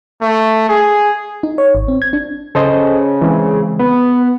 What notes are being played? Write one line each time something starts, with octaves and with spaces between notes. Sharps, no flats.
A3
G#4
D#4
C#5
G#1
C4
G#6
D4
C#3 A4 C5 D#5
E3 G#3 C4
B3 B4